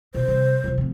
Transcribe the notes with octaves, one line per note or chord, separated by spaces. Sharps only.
B2 C5
C3 G3
C3 F3
F1 F3